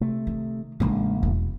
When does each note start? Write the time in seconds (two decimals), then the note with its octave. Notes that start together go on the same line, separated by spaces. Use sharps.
0.01 C3 A3
0.27 D#3
0.80 A1 C#3 G#3 A#3 D4
1.23 E1